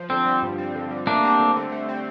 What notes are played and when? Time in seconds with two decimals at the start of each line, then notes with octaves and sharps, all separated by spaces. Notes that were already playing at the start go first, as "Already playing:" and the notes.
Already playing: F3
0.09 D3 C4
0.26 G3
0.42 G2
0.58 C4
0.75 D3
0.91 G3
1.07 A3 A#3 D4
1.24 C4
1.39 D3
1.56 D3
1.72 A3
1.89 C4